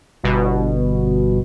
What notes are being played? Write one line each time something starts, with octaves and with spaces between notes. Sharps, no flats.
G1 B2